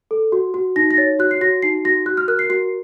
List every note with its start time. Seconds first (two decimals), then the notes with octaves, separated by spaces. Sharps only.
0.11 A4
0.32 F#4
0.54 F#4
0.76 D#4 A#6
0.91 A#6
0.97 C#5 A6
1.19 F#4 F#6
1.31 C7
1.41 F#4 A#6
1.62 D#4 C7
1.85 F#4 A#6
2.06 F#4 F#6
2.17 F6
2.28 A#4 F#6
2.39 C7
2.50 F#4 C7